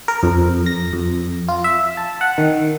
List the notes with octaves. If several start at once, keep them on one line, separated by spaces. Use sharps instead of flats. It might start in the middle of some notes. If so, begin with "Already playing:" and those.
A#4
F2
A#6
F2
F4
E5
A5
F#5
D#3